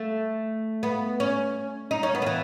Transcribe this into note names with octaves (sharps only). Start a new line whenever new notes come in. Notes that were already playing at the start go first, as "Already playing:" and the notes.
Already playing: A3
B3
C#4
D#4
C#4
B3
D#3
E3